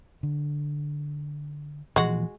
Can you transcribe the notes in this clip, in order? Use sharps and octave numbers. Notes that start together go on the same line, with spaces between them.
D3
A#2 E3 F3 G#3 F#4